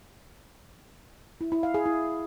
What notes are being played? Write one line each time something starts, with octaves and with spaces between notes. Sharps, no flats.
E4
E4
F5
G#4
E4